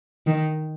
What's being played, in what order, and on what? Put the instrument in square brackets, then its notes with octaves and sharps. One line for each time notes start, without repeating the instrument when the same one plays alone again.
[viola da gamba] D#3